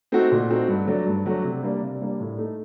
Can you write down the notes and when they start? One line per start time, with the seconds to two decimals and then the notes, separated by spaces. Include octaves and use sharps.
0.12 A3 C4 D#4 F#4
0.32 A#2
0.50 A3 C4 D#4 F#4
0.68 G2
0.87 F#3 A3 D4 F#4
1.07 G2
1.26 F#3 A3 D4 F#4
1.44 C3
1.63 G3 A#3 D4
1.82 C3
2.01 G3 A#3 D4
2.20 A2
2.38 A3 D#4